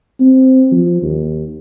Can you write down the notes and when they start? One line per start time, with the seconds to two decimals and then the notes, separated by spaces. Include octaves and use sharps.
0.20 C4
0.72 F3
1.03 D#2